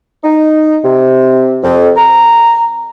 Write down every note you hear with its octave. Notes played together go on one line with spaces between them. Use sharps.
D#4
C3
F2
A#5